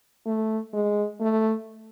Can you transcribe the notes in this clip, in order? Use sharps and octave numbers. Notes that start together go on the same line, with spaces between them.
A3
G#3
A3